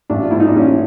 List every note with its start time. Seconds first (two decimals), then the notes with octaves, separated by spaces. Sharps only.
0.10 A1 D4
0.23 F4
0.31 G#2 E4
0.40 D#4
0.47 D4
0.56 A1 C#4